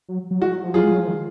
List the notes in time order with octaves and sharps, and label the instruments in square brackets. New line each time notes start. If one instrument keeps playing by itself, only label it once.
[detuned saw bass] F#3
F#3
[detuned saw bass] G#3 [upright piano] F#4
[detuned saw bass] F#3
F3
[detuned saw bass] F#3 [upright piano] F4 G#4
[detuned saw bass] G#3
F#3
F3
D#3